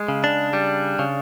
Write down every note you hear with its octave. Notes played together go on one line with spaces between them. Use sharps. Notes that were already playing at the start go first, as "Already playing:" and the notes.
Already playing: G#3
C#3
D4
G3
C#3